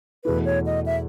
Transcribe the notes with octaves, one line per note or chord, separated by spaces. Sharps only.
E2 B2 A3 E4 B4
C#5
D#5
E5